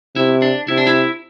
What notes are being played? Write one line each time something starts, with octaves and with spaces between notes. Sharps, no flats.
C3 E4
D4
C3 E4
D4
E4